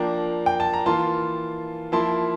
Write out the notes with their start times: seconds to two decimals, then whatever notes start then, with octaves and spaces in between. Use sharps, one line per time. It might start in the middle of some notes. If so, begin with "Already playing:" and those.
Already playing: F3 A#3 D4 G5 A#5
0.46 G5
0.60 A5
0.74 A#5
0.86 E3 A#3 F4 A5 C6
1.92 F3 A#3 E4 A5 C6